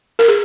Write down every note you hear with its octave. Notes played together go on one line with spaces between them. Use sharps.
A#4
G#4